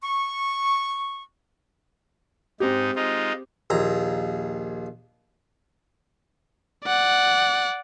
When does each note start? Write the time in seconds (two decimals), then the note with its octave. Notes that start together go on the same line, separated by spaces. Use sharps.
0.03 C#6
2.60 G#2 C4 D#4 G4
2.96 G#3 D#4 F4
3.70 A#1 D#2 A#5
6.85 D5 F#5